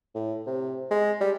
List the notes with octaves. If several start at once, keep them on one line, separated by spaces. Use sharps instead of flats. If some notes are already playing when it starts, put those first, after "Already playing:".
A2
C3
G#3
G3